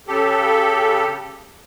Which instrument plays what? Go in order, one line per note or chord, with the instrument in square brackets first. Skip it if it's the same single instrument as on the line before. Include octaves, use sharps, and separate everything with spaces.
[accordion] C#3 G4 A4